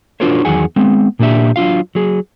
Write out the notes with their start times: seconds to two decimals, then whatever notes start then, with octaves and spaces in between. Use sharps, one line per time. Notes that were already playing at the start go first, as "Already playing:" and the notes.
0.20 D4 F4 F#4 A#4 C5 C#5
0.45 E2 D#3 F#3 G#4 F#5 G#5
0.76 G#3 B3 C4
1.19 A#2 A#3 D4 G4 E5
1.56 F#3 D4 F4 F5
1.95 F#3 G#4